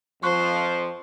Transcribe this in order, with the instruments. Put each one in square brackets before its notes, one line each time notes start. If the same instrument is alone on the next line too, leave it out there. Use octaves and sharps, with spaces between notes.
[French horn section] F2 F3 [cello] C5 [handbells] C6 C#6 F#6